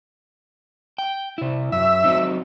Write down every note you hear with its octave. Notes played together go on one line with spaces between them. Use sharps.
G5
C3 E4
F#2 E5
F#3 C4 D#4